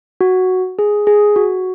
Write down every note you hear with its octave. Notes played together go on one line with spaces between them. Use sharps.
F#4
G#4
G#4
F#4